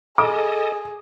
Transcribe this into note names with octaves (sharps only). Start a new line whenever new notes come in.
G#4 A4 D#5 D6